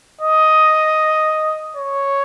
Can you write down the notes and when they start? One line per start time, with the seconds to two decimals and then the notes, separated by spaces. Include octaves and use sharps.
0.21 D#5
1.76 C#5